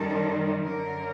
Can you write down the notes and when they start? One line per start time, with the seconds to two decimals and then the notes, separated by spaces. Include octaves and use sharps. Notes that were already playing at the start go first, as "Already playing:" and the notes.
Already playing: F#2 D#3 G3 A4
0.61 F#2 D3 F#3 A#4